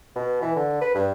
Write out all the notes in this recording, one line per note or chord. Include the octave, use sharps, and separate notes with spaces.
B2
E3
D3
B4
G2